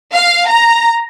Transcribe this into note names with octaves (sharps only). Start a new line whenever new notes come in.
F5
A#5